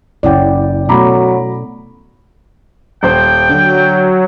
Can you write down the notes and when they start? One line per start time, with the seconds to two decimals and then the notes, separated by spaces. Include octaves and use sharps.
0.23 F#1 C#4 E4 D5 F#5 G5
0.89 B2 F#3 A3 A#5 B5 D6
3.03 D#1 C5 G5
3.49 D3 F#3